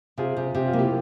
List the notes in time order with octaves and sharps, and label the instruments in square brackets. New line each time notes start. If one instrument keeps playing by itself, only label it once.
[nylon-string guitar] C3 [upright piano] F4 G#4
[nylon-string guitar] C3
[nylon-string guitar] C3 [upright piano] G4
[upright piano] F4
[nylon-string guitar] A#3
[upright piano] E4 G4